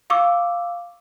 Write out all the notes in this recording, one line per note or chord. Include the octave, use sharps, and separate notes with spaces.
F5 C#6 D6 E6